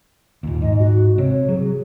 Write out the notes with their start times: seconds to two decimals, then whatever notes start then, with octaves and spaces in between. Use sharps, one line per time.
0.43 D#2 A#2
0.62 G#2 D#5
0.79 F#4
1.18 C3 C#5
1.48 F#3 G#4